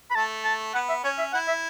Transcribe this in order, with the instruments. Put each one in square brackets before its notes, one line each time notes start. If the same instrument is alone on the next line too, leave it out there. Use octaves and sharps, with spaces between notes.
[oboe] B5
[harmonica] A3 [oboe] A5
[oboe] A5
[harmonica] B3 [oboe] F#5
[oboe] E5
[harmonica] C#4 [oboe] C#5
[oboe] E5
[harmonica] E4 [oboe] F#5
[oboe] E5